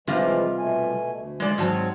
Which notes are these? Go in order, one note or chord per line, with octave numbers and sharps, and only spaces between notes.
C3 E3 F3 G3 G#3 F4
B2 A3 G#5
D2
G#3 D5
G#2 F#3 C4 A5